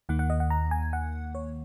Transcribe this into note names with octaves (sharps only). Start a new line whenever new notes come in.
D#2 D#3 A#3 F#5
F#5
D#5
F#5
A#5
G#5
F#5
C#5